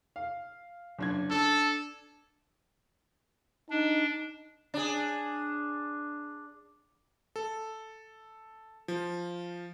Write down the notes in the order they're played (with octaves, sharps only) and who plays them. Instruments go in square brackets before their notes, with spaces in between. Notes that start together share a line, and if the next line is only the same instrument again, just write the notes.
[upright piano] F5
F#1 D4 G#6
[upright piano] D4 [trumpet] A4
[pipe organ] D4 [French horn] D#4
[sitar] D4 G#4
[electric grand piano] A4
F3